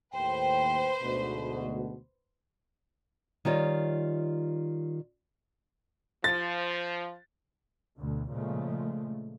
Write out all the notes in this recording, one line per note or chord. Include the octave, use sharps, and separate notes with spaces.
D#2 A2 B4 C5 G5
D2 G#2 B2
D#3 G3 F4 C#5 D#5
F3 A6
D2 B2 D3
A#2 C#3 F3 G#3 A3